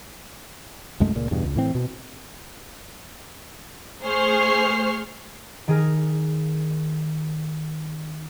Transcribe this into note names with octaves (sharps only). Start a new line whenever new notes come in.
C2 F#2 G#3 A3
C#2 A#2
E2 G2 B2
C#2
A2 E3 C4
B2
A3 G#4 C5 C#6 F6 C7
D#3 G#4 A#4